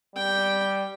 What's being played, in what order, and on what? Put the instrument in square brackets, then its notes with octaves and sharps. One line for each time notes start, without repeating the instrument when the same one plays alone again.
[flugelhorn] G3 [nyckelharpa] G5